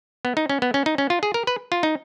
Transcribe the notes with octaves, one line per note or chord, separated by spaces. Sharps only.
B3
D#4
C#4
B3
C#4
D#4
C#4
F4
G#4
A#4
B4
F4
D#4